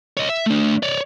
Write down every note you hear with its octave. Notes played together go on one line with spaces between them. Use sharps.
C#5 D#5
E5
A3 D4
C#5 D5